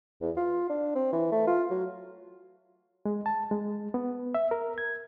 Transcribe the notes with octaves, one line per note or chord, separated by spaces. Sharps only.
E2
F4
D4
C4
E3
A3
F4
F#3
G#3
A5
G#3
B3
E5
A#4
G#6